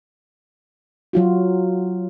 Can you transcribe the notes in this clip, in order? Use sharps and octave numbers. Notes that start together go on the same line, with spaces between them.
F#3 F4 F#4